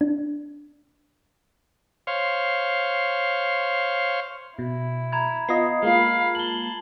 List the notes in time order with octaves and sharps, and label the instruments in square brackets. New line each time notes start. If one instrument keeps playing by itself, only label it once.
[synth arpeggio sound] D4
[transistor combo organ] C5 C#5 F5
[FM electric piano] B2 [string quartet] E4
[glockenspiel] A#5 B5 G#6
[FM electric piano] B3 F4 D#5 [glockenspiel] C7
[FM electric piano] G#3 A#3 F4 [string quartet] F5 B5
[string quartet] A5 [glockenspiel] F#7 G7